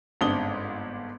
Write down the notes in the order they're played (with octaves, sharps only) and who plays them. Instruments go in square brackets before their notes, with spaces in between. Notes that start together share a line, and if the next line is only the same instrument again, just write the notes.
[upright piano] G1 G#2 C4 D4 D#6 G7